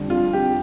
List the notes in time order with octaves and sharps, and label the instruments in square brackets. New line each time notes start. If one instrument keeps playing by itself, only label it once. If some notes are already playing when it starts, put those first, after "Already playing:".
Already playing: [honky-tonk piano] F2 D3 G3
[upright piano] F4
G4